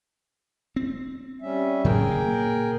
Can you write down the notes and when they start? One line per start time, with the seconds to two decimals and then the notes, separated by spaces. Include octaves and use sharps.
0.76 C4
1.42 G3 C#4 E5
1.84 A2 C#3 F#3 G#4 A#4 G5
2.08 A#2 A#3